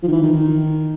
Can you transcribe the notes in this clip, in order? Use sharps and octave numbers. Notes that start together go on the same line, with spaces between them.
F3
D#3
E3
D#3
D#3